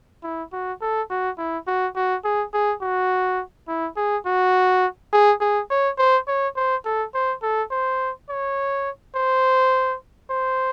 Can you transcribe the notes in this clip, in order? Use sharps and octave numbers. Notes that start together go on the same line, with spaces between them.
E4
F#4
A4
F#4
E4
F#4
F#4
G#4
G#4
F#4
E4
G#4
F#4
G#4
G#4
C#5
C5
C#5
C5
A4
C5
A4
C5
C#5
C5
C5